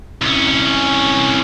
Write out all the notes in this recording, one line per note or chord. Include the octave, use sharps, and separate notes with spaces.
C2 C#4